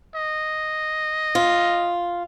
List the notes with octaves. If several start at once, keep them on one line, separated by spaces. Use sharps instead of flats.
D#5
F4